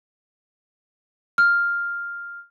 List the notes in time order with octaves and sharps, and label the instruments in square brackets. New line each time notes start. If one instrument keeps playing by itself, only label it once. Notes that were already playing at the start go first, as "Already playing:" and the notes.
[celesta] F6